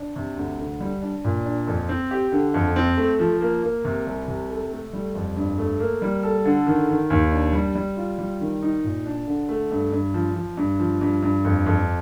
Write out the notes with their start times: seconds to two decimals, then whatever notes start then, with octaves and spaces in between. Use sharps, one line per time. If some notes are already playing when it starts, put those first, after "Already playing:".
Already playing: D4
0.16 C3
0.37 D2
0.59 D3
0.81 G3
1.02 D4
1.24 A#2
1.46 D4
1.67 F2
1.89 C4
2.11 G4
2.32 D3
2.54 F2
2.76 C4
2.97 A3
3.20 F3
3.41 A#3
3.63 A#3
3.85 C3
4.06 C2
4.28 C3
4.49 A4
4.71 A3
4.93 G3
5.15 F2
5.37 G2
5.58 A3
5.80 A#3
6.02 G3
6.23 A4
6.45 D3
6.67 D#3
6.89 D#3
7.10 D#2
7.32 D4
7.53 G3
7.75 G3
7.97 F4
8.19 G3
8.41 D#3
8.62 D#4
8.84 A#2
9.06 D4
9.28 D3
9.49 A3
9.71 G2
9.92 G2
10.14 F3
10.36 F3
10.57 G2
10.80 F3
11.01 G2
11.23 G2
11.45 F2
11.66 F2